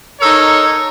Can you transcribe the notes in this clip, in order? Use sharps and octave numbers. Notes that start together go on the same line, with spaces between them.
D#4 A4 A#4 C#5